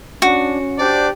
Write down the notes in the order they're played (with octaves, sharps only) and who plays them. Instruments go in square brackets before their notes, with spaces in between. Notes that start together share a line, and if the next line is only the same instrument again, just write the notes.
[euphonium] C#4 [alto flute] D4 [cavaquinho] F#4
[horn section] D4 G4 D5 [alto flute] C5